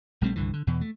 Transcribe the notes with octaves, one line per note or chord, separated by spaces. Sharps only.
A#1 G3 A3 C4
C2 G2 D3 E3
D3
E2 B2 E3
A3